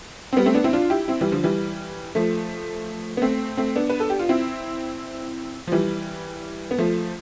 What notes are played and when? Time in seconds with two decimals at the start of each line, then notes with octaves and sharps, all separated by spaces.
0.33 C4
0.37 G3 B3
0.46 A3 C4
0.54 B3 D4
0.64 C4 E4
0.73 D4 F4
0.90 E4 G4
1.08 C4 E4
1.21 E3 G3
1.32 D3 F3
1.43 E3 G3
2.15 F3 A3
3.17 B3
3.22 A3 C4
3.57 A3 C4
3.76 B3 D4
3.90 B4
4.00 A4
4.10 G4
4.19 F4
4.29 C4 E4
5.67 F3
5.72 E3 G3
6.71 B3
6.78 F3 A3